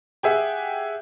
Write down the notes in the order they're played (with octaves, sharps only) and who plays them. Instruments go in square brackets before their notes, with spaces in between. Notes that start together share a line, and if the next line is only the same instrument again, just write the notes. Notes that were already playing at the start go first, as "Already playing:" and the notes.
[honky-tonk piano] G4 G#4 E5 F#5